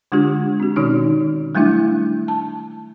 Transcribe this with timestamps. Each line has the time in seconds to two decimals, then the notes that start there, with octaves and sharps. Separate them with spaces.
0.12 D3 G#3 D4 F4 G4 G#6
0.60 C4 F#4
0.76 B2 D#3 C#4 D#4 C#5 F6
1.55 F#3 G3 A3 D4 E4 E5
2.28 A5